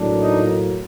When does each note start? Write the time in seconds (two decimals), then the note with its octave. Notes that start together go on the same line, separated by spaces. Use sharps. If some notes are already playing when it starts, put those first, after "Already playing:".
Already playing: A2 F#3 A#3 D4
0.19 D#4